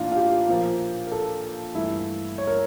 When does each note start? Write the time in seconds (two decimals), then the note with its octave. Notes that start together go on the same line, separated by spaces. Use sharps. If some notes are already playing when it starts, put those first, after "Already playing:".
Already playing: A2 E3 A#3 D4 F4
0.12 F4
0.16 G4
0.48 A#2 F3 A#3
1.07 A#4
1.12 A4
1.75 G2 E3 A3 E4
2.38 C#5
2.47 A#4